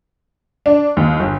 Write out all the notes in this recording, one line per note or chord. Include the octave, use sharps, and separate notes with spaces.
D4
D#2
G1